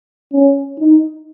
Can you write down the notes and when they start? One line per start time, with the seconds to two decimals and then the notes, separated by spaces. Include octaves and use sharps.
0.33 C#4
0.79 D#4